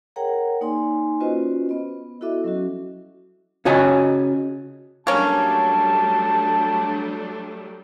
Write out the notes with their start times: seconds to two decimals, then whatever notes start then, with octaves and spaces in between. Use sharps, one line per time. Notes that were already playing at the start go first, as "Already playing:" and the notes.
0.16 G#4 A#4 C#5 F#5 G5 A#5
0.61 A#3 D#4 D5 G#5 C6
1.20 C#4 F4 F#4 B4 C5 D#5
1.69 B3 D#5
2.21 E4 F#4 A4 D#5 E5 D6
2.44 F#3 C#4 F#4
3.65 C#3 F#4 C#5 D#5 G#5
5.07 F#3 G3 A3 A#3 C#4 D4 A5